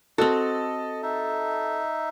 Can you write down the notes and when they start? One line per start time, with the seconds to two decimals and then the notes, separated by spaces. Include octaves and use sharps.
0.18 C4 F#4 A4 D#5
1.03 D#4 E5